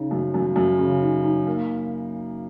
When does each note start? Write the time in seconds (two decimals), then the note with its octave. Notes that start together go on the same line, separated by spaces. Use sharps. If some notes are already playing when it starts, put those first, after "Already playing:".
Already playing: C#3 D#4
0.11 F#2
0.34 F#2
0.56 F#2
0.79 C#3
1.01 D#4
1.24 D#4
1.47 A#3